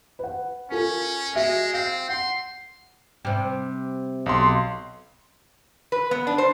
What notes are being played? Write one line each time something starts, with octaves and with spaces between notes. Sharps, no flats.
B4 F#5
C#4 F4 A4 A#4
G#3 F#4 E5
C4 F5
F#5 C6
C3 G3
B1 C6
B4
B3
D4
C5